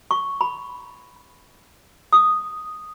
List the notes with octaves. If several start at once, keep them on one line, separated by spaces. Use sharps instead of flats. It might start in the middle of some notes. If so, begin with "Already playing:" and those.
C#6
B5
D#6